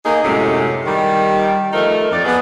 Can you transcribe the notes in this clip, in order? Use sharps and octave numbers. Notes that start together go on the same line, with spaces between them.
A#3 D#4 G#4
F#2 A2 C3 G#3
D#3 G3
F3 A3 D#4 A#4
F2 D5
B3 G#4